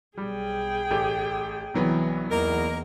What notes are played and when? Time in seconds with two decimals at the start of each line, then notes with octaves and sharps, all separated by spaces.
0.18 B1 G3 G#4 G5
0.91 A1 A3 G4
1.74 C2 E3 F#3 B3
2.30 E2 A#3 D#4 A#4